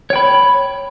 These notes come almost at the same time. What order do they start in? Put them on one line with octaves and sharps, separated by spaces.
C#5 G5 B5